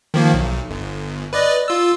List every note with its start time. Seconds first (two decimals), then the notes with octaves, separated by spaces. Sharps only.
0.14 D#3 F3 A#3
0.34 B1
0.70 G1
1.33 B4 D5 D#5
1.68 F4 E6